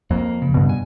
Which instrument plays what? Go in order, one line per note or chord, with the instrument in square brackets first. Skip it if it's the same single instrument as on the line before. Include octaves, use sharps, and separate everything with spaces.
[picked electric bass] F2 [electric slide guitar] A#3
[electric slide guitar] C#3
[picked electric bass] G2 B2
[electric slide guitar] G#5